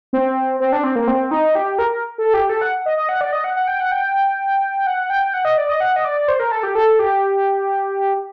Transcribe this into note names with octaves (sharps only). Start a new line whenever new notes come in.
C4
C4
D4
C4
A#3
C4
D#4
G4
A#4
A4
G4
A4
F#5
D#5
D#5
F#5
D5
D#5
F#5
F#5
G5
F#5
G5
F#5
G5
F#5
D#5
D5
D#5
F#5
D#5
D5
C5
A#4
A4
G4
A4
G4